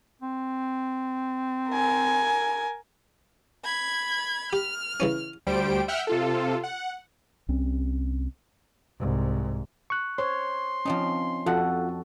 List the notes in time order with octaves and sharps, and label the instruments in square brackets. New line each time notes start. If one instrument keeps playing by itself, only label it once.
[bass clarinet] C4
[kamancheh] A#4 G#5
[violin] B5 G#6
[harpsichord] G4 [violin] F6
[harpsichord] C#3 E3 C#4
[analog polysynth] D2 G3 C5 G5 D7
E5 F#5 G5 F6 G6
C3 F4 A4
F#5
[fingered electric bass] C2 C4 C#4
[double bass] C2 G#2
[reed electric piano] C#6 F#6
[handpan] C5 C#5 [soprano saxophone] C6
[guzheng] F3 C4 D#4 [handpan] C#4
[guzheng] F2 [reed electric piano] F4 F#5 [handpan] F#4 A4